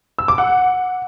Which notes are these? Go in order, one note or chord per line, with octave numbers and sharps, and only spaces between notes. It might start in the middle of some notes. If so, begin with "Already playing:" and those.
E6
D6
F#5